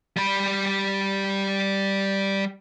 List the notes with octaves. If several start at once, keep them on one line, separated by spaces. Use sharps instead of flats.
G3 B5